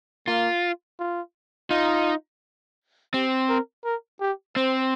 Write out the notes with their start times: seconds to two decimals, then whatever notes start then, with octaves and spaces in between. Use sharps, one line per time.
0.27 A#3 F4
1.00 F4
1.70 D#4 F4
3.14 C4 G4
3.49 A#4
3.85 A#4
4.21 G4
4.56 C4 C5